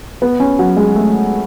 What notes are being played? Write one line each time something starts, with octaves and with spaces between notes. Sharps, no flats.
B3
C#4
F#3
G#3
A3